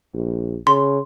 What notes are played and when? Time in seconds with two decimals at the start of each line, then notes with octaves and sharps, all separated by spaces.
0.14 A#1
0.67 C#3 C6